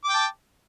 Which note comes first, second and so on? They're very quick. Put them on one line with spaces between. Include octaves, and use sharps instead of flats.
D6 G5 A5